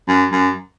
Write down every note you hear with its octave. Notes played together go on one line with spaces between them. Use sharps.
F#2
F#2